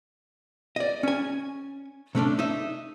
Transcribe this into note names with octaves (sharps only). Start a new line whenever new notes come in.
D5 D#5
C#4 G#5
C3 A3 C#4 D4
D#4 E5